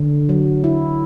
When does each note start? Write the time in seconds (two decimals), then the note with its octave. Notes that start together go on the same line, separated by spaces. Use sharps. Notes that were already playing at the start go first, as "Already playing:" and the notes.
Already playing: D3
0.29 F#3
0.64 E4